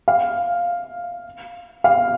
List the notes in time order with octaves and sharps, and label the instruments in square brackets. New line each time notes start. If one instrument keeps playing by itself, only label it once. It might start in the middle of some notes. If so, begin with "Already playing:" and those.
[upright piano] F5
F5